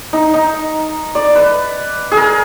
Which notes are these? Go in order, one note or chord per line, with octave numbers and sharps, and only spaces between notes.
D#4
D#4
D5
B4
G#4
A#4